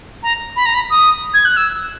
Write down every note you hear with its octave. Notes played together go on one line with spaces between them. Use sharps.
A#5
B5
A#5
B5
D#6
G#6
F#6
E6